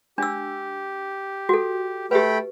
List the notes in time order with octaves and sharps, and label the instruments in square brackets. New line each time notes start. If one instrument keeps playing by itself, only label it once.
[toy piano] D4 E6 [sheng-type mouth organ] G4
[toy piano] F#4 A4
[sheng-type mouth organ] A3 G5 B5 [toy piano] G4 B4